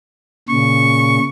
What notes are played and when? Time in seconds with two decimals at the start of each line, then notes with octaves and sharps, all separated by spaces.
0.49 A#2 C#3 C#6